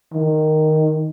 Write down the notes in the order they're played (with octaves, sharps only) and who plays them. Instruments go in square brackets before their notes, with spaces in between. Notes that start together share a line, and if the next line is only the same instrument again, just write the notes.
[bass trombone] D#3